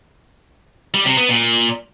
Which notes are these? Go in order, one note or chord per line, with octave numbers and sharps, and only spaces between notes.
G3
C3
B3
A#2